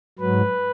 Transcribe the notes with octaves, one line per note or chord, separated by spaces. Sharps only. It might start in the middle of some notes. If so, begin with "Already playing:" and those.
G#2 F#3 B4